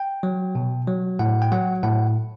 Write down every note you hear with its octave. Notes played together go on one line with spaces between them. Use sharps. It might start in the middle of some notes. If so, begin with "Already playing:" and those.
Already playing: G5
F#3
B2
F#3
A2 F#5
G5
F#3 F#5
A2 F#5